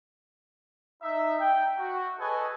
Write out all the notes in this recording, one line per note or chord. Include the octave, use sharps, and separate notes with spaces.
D#4 E5
G5
F#4
G#4 A4 B4 C#5 D#5 G#5